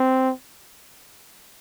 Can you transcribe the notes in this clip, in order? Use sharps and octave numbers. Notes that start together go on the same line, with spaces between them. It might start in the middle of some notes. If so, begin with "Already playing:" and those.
Already playing: C4